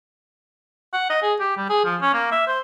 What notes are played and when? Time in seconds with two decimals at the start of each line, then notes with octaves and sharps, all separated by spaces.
0.93 F#5
1.10 D#5
1.23 G#4
1.40 G4
1.57 G3
1.69 G#4
1.85 F3
2.02 C#4
2.14 A#3
2.32 E5
2.47 C5